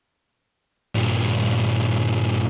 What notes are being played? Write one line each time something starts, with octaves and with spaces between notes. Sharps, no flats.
G2 A#2